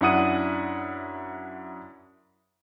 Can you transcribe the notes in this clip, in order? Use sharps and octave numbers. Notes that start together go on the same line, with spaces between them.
F#2 D4 E4 F#5 D#6 D#7